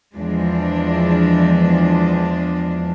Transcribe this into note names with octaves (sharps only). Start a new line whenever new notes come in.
E2 F3 G#3 D4